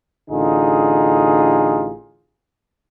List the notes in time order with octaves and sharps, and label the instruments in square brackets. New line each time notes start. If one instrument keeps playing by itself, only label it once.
[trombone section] A1 D3 D#4 F4 G#4